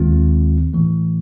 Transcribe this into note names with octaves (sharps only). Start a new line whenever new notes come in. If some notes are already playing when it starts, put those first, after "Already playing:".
Already playing: D#2 D#3 G#3 C4 F4
A1 A2 E3 A3